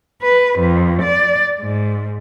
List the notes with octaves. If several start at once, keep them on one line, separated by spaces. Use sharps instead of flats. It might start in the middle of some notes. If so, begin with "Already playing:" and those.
B4
F2
D5
G#2